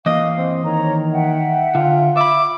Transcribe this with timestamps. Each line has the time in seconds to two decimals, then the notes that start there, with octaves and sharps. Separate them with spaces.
0.06 E3 A#3 D#5 F5
0.38 C4
0.64 D#3 C#5 A#5
1.12 E5 F#5 G5
1.75 D3 F4
2.17 E5 B5 D6